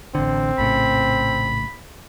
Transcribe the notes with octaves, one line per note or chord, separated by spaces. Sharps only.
A1 D3 C4
A#1 A2 C#3 B5